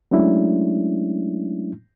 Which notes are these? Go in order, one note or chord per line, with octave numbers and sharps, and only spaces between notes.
F#3 G#3 A3 C#4 D4 E4